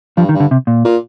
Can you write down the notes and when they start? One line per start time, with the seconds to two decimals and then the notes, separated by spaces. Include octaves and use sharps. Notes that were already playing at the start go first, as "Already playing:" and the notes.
0.17 G2 F3
0.29 D#3
0.34 G2
0.40 D3
0.51 C3
0.67 A#2
0.85 A#2